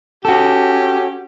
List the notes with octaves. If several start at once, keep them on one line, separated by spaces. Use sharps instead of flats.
C#4 F#4 G4 A4